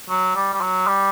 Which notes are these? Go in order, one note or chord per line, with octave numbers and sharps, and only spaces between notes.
F#3
G3
G3
F#3
G3